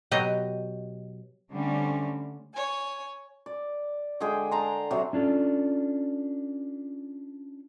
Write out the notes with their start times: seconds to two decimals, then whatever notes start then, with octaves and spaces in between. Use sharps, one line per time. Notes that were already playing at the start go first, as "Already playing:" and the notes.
0.11 B2 F#3 G4 D#5
1.51 D3 G3 A3 C4 C#4
2.54 C#5 G#5
3.46 D5
4.20 D3 G#3 G#4 G5
4.51 A5 A#5 C6
4.91 C3 F#3
5.13 C#4 D4 F4 A4